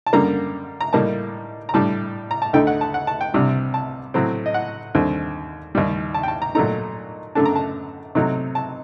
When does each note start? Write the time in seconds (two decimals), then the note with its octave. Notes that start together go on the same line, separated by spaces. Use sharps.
0.06 A5
0.13 F#2 D3 G3 A#3 A#5
0.81 A#5
0.93 A2 G3 A#3 D#4 A5
1.69 A#5
1.74 A2 G3 D4 A5
2.31 A#5
2.42 A5
2.53 D2 D3 A3 D#4 G5
2.67 F#5
2.81 A5
2.94 F#5
3.07 A5
3.21 G5
3.34 C2 C3 G3 D4
3.74 A5
4.14 A2 F#3 A3 C4
4.46 D#5
4.54 F#5
4.95 D#2 D3 G3 C4
5.75 D#2 D#3 G3
6.14 A5
6.23 G5
6.28 A5
6.42 A#5
6.55 A#2 F#3 A3 D#4 A#5
7.35 F#2 D3 A3 D4 A5
7.46 A#5
7.56 A5
8.15 C3 F#3 A3 D#4
8.55 A5